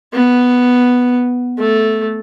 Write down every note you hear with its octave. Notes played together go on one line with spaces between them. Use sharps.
B3
A3